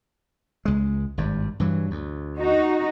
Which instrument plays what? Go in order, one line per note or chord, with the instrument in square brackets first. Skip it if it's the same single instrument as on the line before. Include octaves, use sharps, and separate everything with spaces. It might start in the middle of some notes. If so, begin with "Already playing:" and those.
[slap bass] C#2 G#3
G#1 G2
G2 E3 F#3
D2
[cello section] D#4 F#4